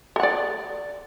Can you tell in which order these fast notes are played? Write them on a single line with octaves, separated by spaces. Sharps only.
A4 F#5 D5